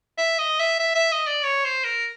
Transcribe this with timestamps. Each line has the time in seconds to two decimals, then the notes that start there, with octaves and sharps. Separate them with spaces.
0.18 E5
0.39 D#5
0.59 E5
0.79 E5
0.95 E5
1.12 D#5
1.27 D5
1.43 C#5
1.64 C5
1.85 A#4